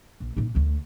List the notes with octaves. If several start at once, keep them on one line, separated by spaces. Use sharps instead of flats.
A#1
A#2 D#4
D2 A3